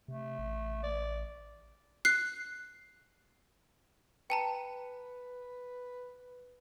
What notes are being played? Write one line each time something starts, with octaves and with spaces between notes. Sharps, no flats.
C3 A3
A1
D5
F#6 C7
B4 G5 A5 A#5